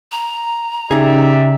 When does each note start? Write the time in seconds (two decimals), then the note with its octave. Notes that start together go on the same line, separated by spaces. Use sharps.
0.12 A#5
0.91 C#3 D#4 G4 G#4 D5 E5